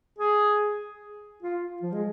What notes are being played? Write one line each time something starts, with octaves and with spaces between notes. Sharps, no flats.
G#4
F4
F3
G#3